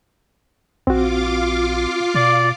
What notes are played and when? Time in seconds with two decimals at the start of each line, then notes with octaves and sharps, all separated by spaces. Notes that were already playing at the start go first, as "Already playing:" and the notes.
0.87 A#1 C4 F4 F#4 F5 D6
2.14 B2 D5